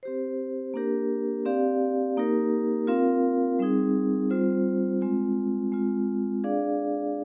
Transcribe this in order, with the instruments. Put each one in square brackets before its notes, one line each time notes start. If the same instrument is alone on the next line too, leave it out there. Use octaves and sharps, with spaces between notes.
[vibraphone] C4 G4 C5
A#3 D4 G4 A#4
C4 G4 D5 F5
A#3 D#4 G4 A#4
C4 F4 A#4 F5
G3 C4 D#4 G#4
G3 C4 F4 C5
G#3 C4 F4
G#3 C4 F4
D4 G#4 D5 F5